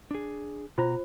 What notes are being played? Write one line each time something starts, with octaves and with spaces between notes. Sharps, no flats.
D4 G#4
B2 F4 C5 A#5